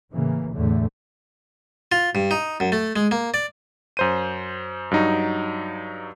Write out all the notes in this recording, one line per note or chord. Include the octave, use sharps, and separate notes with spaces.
A2 C#3 E3 A#3
E2 A2 D3 A3
F4
G2
D#4
F#2
A3
G#3
A#3
D5
F#2 C5 D#7
G2 F#3 D#4